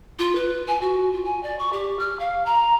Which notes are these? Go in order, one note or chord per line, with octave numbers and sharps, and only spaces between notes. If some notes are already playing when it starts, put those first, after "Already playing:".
F4
B4
G#5
F#4
F4
G#5
D5
C#6
G4
F6
F5
A#5